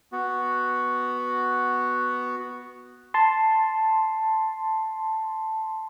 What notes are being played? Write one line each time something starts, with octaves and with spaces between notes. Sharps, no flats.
B3 F#4
A5 C6